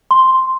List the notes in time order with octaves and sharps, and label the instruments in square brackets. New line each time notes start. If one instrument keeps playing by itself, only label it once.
[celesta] C6